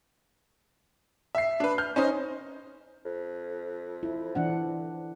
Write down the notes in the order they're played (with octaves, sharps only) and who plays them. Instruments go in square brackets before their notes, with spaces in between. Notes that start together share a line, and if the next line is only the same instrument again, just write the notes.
[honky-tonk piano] E5 C7
D4 B4
F6 G6
C#4 D#4 C5 D#5
[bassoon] F2
[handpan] E4
E3 D4 F#5